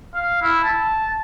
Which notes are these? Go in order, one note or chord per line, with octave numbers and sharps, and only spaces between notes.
F5
E4
A5